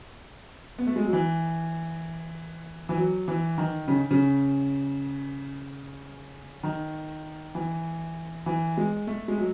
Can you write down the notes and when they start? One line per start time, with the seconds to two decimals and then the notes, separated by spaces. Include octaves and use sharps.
0.78 B3
0.87 A3
0.96 G#3
1.05 F#3
1.13 E3
2.89 E3
2.97 F#3
3.28 E3
3.58 D#3
3.88 C#3
4.11 C#3
6.63 D#3
7.55 E3
8.46 E3
8.77 G#3
9.07 A3
9.28 G#3
9.38 F#3